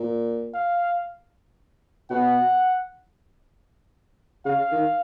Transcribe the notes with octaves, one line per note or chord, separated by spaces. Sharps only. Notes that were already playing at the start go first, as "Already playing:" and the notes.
Already playing: A#2
F5
B2 F#5
C#3 F5
D#3